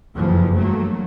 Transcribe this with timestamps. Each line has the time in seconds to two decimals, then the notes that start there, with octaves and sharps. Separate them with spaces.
0.16 F#1 F2 E3 F3
0.56 G2 F#3 A3 A#3